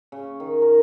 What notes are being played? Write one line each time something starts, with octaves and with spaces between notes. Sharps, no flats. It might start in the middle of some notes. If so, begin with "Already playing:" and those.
C#3
D#3
A#4